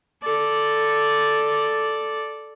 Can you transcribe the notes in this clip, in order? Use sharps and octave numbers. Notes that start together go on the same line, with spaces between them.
A4 D5